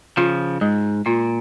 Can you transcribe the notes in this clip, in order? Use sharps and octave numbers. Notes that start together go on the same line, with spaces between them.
C#3 F3 F4
G#2 G#3
A#2 F4